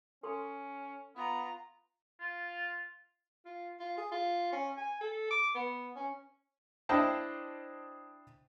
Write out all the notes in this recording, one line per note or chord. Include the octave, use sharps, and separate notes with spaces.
C#4 A4 C6
B3 F4 A#5
F4
F4
F4
G#4
F4
C#4
G#5
A4
D6
B3
C#4
D4 E4 C5 D#5 G5 A5